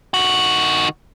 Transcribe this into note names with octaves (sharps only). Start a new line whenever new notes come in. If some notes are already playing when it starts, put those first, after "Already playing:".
D#3 F#4